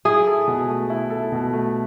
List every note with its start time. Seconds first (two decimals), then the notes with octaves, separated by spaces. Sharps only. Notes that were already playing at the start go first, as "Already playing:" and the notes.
0.05 E4 G#4
0.27 A4
0.48 B2
0.69 A3
0.90 E4
1.10 A4
1.32 B2
1.53 A3